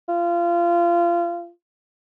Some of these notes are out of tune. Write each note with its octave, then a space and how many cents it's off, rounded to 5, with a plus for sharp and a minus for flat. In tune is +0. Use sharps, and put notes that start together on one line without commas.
F4 -25